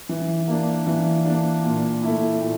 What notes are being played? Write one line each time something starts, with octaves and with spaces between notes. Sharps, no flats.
E3
A#3 D4
E3
A#3 D4
A#2
A3 E4
A#2